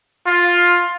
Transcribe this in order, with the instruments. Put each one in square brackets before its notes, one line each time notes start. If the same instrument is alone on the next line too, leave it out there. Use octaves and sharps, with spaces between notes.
[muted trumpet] F4